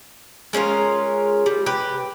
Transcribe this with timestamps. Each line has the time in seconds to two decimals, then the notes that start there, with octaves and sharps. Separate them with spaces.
0.53 G#3 C#4 F4 A#4
1.46 G3
1.66 G4 B4